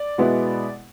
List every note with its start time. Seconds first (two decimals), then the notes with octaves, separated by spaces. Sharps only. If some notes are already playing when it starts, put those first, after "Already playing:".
Already playing: D5
0.18 B2 G#3 B3 E4